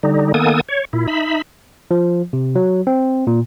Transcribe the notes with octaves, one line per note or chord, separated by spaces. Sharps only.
D3 G3 D#4
D#3 A#3 B3 A4 G#5 D#6
C#5
A#2 E4
D#4 E5 B5
F3
C3
F#3
C4
A#2